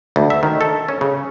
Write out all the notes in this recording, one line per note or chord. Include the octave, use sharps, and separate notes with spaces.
D2
E5
D#3
A4
C#4
C#3